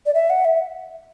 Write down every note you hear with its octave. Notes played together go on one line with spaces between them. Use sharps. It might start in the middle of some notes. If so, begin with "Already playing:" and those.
D5
E5
F#5
E5